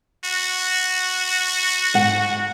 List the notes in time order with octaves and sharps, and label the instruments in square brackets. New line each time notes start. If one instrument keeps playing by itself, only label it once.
[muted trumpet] F#4
[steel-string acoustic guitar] G#2 F#5